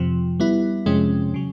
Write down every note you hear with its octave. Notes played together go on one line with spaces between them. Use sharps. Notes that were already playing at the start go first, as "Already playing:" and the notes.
Already playing: F2 C3 F3
G3 B3 E4
F2 C3 F3 G#3 C#4
C#3 F#3